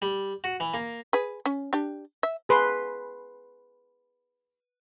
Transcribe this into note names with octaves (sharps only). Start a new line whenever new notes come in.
G3
F#4
E3
A#3
G#4 B4
C#4
D4 G4
E5
G#4 B4 C6